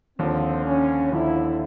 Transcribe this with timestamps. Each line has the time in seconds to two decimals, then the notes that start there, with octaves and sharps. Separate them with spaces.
0.18 D#2 D3 F3 C4
0.65 C#4
1.12 D#2 D3 F3 E4